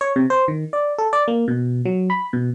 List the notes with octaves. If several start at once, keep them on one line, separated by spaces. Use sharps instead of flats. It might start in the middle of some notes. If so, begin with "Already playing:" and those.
C#5
C3
C5
D#3
D5
A4
D5
A#3
B2
F#3
B5
B2